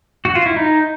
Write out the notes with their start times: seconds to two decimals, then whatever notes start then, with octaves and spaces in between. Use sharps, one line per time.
0.25 F#4
0.35 F4
0.46 E4
0.56 D#4